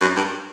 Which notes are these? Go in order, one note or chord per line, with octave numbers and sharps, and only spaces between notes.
F#2
G2